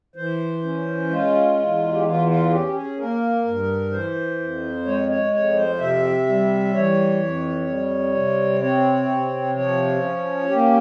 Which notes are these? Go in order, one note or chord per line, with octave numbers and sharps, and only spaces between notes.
E3 C5
C#4
G#3 F4
E2
G4
E3 F4
F4
G#4
C#4 G4
G#4
A#3 A#4
G2
E3 C5
F2
G#3 C#5
C#5
F2 C#5
C5
C3 E5
G3
E3 C#5
F2
G3
C3
C4 C#5
C3
F3 C#5
C#4
A#3 G4